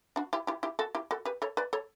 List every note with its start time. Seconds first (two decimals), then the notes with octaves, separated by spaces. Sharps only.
0.16 D4 F#4
0.33 E4 G4
0.47 E4 G4
0.63 E4 G4
0.79 F#4 A4
0.95 E4 G4
1.11 F#4 A4
1.25 G4 B4
1.42 A4 C#5
1.57 B4 D5
1.73 A4 C#5